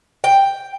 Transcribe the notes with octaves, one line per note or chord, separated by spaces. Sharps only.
G5